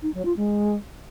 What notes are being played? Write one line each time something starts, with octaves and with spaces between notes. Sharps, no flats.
D#4
F#3
F4
G#3